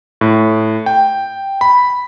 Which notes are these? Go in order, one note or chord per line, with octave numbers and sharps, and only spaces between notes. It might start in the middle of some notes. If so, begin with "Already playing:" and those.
A2
G5
B5